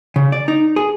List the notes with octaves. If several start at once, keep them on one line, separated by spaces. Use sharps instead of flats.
C#3
D5
D#4
G#4